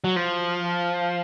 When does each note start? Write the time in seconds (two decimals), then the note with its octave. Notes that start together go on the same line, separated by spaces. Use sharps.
0.04 F#3
0.16 F3